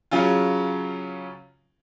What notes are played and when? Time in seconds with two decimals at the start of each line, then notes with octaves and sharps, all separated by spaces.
0.11 C#3 F#3 C#4 F4